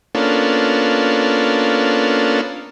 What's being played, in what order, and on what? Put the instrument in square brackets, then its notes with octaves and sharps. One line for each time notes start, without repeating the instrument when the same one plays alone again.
[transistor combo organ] A#3 B3 C#4 D4 F4 A4